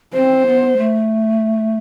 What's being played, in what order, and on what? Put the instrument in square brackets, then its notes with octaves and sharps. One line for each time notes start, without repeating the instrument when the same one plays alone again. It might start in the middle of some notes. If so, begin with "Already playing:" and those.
[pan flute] C4 [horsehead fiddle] C5
[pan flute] B3
A3